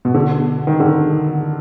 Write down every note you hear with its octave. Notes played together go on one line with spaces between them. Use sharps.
B2
D3
D#3
D3